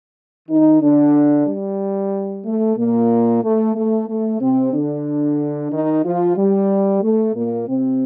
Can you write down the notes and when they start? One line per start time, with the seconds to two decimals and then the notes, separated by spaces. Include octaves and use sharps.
0.49 D#3 D#4
0.82 D3 D4
1.47 G3
2.45 A3
2.77 A#2 A#3
3.43 A3
3.75 A3
4.08 A3
4.41 C3 C4
4.73 D3 D4
5.71 D#3 D#4
6.04 F3 F4
6.36 G3
7.02 A3
7.35 A#2 A#3
7.67 C3 C4